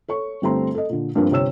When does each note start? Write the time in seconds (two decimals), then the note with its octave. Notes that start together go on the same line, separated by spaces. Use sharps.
0.08 A4 C#5 C#6
0.42 G1 G3 A3 C4 A#5 C6
0.75 A4 D#5
0.89 A#2 D3
1.15 G2 F3 A#3 C4 D4
1.31 G1 C3 C4 C#5 E6 E7